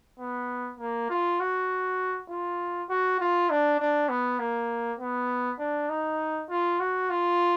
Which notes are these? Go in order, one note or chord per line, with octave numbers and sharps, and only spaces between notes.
B3
A#3
F4
F#4
F4
F#4
F4
D4
D4
B3
A#3
B3
D4
D#4
F4
F#4
F4